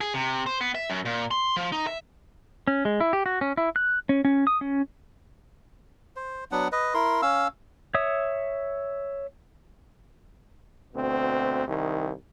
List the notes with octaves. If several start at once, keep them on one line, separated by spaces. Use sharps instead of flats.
G#4
C3
C5
B3
E5
F#2
A#2
C6
F3
D#4
E5
C#4
G#3
E4
G4
F#4
C#4
E4
F#6
C#4
C#4
D#6
C#4
C5
F#3 B3 D4 F#5
B4 D#5
E4 A#4 C6
C#4 F5 E6
C#5 E5 D#6
D2 B2 C4
C2 D#3